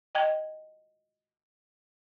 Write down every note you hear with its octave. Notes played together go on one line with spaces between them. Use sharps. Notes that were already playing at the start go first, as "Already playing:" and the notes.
D#5 G5 G#6